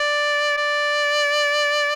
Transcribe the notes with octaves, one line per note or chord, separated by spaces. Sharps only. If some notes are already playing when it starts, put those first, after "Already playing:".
Already playing: D5
D5